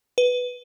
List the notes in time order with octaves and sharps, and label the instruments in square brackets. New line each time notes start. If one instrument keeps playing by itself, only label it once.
[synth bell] B4